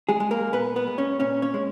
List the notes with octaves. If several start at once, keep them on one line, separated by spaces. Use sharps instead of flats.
G#3 G#4
G#3
A#3 A#4
A#2 B3 B4
B3 B4
G#3
C#4 C#5
A#2 C#4 C#5
C#4 C#5
G#3